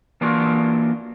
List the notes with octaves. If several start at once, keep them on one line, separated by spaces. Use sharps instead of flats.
E3 A#3 D4 F4 F#4